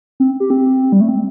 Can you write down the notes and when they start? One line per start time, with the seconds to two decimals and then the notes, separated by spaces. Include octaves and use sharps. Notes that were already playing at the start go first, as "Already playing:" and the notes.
0.20 C4
0.40 G4
0.50 C4
0.92 G3
1.01 A3
1.09 C4